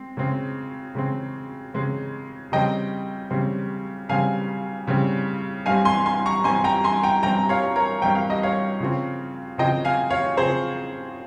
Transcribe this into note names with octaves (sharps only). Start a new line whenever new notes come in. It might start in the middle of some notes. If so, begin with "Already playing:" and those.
Already playing: G#3 C4
C#3 G#3 C4
C#3 G#3 C4
C#3 G#3 C4
C#3 G3 C4 D#5 G5
C#3 G3 C4
C#3 G3 C4 F5 G#5
C#3 G3 C4
G2 G3 C4 F5 G#5
G#5 C6
G#5 C6
A#5 C#6
G2 G3 C4 G#5 C6
G5 A#5
G#5 C6
G5 A#5
G2 G3 C4 G5 A#5
C#5 F5
A#4 C#5
G2 G3 C4 G5
F5
D#5
C#5 F5
C#3 F3 C4
C#3 F3 C4 D#5 G5
F5 G#5
C#5 F5
C#3 F3 C4 G#4 C5